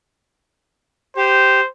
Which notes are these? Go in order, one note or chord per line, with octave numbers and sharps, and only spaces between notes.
G4 C5